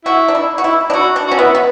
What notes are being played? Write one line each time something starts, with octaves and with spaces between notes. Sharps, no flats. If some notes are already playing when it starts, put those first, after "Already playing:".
E4 F#4
D4
E4
F#4
E4
D4
E4 F#4
D4
C#4 F#4
B3 E4
B3